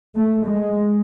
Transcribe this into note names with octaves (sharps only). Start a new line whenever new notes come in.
A3
G#3